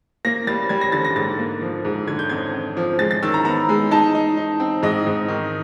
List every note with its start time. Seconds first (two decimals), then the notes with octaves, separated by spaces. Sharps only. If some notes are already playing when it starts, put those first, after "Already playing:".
0.25 A#3 A#6
0.47 G3 A6
0.69 G3 G#6
0.81 A#6
0.92 D3 A6
1.05 A#6
1.16 G#2 A6
1.39 A#3
1.61 F3
1.85 G#2
2.07 D3 G#6
2.19 G6
2.29 F2 G#6
2.53 F2
2.77 F3
2.99 G#3 A6
3.11 A6
3.23 D#3 E6
3.34 A#5
3.45 B3 A#5
3.69 G#3
3.91 D#4 A5
4.15 D#4
4.37 D#4
4.60 C4
4.83 G#2 D#5
5.07 G#2
5.28 D#3